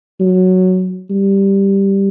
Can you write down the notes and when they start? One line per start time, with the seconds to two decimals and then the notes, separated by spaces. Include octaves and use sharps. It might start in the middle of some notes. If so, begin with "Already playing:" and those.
0.20 F#3
1.10 G3